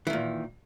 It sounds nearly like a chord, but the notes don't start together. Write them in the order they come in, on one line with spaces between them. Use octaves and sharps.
E3 D#3 A#2